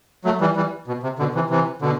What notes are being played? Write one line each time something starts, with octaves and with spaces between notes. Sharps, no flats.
F#3 A3
E3 G3
E3 G3
B2
C3
B2 D3
C3 E3
C3 E3
B2 D3